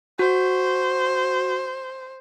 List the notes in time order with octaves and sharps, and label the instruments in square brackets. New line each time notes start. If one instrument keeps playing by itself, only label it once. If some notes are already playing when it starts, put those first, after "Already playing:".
[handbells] F#4 [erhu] C5